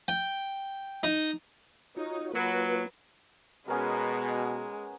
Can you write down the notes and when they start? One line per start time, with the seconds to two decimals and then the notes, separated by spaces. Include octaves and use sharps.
0.08 G5
1.03 D#4
1.96 D#4 F4 F#4 C#5
2.33 F#3 A#3 F4 B4
3.68 B2 G#3 B3 C#4 A#4